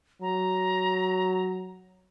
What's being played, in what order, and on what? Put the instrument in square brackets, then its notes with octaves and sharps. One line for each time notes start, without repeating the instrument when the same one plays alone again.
[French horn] F#3 [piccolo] A#5